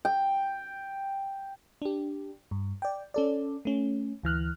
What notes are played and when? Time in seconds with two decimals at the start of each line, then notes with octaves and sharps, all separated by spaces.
0.05 G5
1.82 D4 G4
2.51 G2
2.82 D5 G5
3.14 C#4 A4 D5
3.65 A3 C#4
4.23 D2 E3 F6 F#6